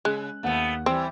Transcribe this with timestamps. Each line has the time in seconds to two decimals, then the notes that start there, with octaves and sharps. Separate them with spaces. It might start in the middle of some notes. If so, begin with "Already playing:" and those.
0.05 C#3 G#3 F#6
0.43 D#2 A3 B3 F#5
0.86 E3 G3 C4 E6